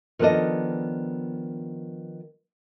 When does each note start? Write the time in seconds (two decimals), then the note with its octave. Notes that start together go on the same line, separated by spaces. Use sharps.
0.19 D#3 F3 B3 D4 A4 D#5